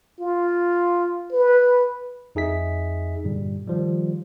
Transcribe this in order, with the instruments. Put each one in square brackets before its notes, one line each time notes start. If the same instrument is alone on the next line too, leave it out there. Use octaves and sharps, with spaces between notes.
[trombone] F4
B4
[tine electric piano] F2 D#4 G#4 E5 B6
G2 A#2 D3 G3
D#3 F3 G3